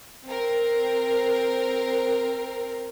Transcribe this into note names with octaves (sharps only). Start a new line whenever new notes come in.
C4 A#4